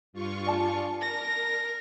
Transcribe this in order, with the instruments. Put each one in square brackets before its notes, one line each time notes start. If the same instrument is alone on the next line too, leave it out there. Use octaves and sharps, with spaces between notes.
[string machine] G2 F4 C#6
[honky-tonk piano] D5 G#5 A5
[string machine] A#4 [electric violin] A#6